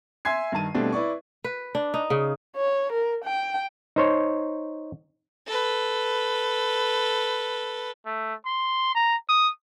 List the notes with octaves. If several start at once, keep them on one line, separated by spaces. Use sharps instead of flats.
E5 G#5 C6 G#6 C7
G2 D#3 A5 D#7
B2 G3 A3 C4 D4
E4 B4 D5 C#6
B4
D4
D#4
C#3
C#5
A#4
G5
D#4 C5 C#5
A4 B4
A3
C6
A#5
D#6